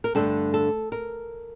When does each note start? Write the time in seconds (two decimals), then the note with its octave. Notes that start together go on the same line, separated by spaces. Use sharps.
0.04 A#4
0.15 G2 D3 A3 D4 A4
0.54 A4
0.92 A#4